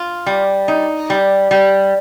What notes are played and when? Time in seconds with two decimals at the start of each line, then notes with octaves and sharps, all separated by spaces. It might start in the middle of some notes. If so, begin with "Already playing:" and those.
Already playing: F4
0.26 G3
0.68 D#4
1.10 G3
1.51 G3